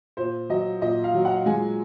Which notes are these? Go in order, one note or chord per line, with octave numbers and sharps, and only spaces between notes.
A#2 C5
F#3 D#5
A#2 D#5
F5
F#3
F#5
G#3 G#5